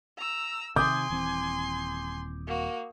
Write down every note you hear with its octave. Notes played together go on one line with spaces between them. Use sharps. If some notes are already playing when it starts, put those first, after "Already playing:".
A#5 E6
C3 D#3 G#5 C6 D6 D#6 G6
D#1 E3 C4
A#3 F#4